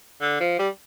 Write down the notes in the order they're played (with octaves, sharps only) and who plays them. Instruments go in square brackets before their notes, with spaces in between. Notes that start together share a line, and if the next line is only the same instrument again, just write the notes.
[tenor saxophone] D3
F3
G3